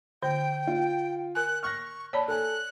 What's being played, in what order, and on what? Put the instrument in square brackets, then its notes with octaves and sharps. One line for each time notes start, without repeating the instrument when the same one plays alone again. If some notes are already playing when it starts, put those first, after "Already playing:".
[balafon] D3 [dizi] G5 [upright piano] G6
[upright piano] F4
[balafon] A#4 G#5 [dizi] F#6
[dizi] C#6 [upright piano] F6 F#6 A#6
[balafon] C#5 D5 A5 [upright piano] B5
[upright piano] A4 G#5 [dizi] F#6